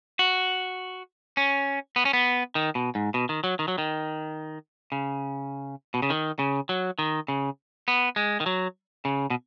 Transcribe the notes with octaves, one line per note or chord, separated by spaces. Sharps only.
F#4
C#4
B3
C#4
B3
D#3
B2
G#2
B2
D#3
F#3
D#3
F#3
D#3
C#3
B2
C#3
D#3
C#3
F#3
D#3
C#3
B3
G#3
D#3
F#3
C#3
B2